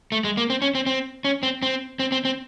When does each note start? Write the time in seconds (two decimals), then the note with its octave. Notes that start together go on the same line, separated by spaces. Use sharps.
0.12 A3
0.24 G#3
0.37 A#3
0.50 C4
0.62 C#4
0.75 C4
0.86 C4
1.25 C#4
1.43 C4
1.62 C4
1.99 C4
2.12 C4
2.25 C4